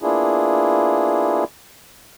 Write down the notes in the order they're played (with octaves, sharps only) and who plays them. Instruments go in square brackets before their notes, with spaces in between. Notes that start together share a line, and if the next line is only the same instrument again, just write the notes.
[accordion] A#3 B3 D4 E4 F4 G#4